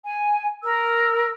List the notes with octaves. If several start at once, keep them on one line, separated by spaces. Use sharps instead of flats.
G#5
A#4 E6